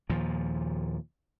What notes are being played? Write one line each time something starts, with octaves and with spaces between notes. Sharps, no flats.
D#2 A#2 F3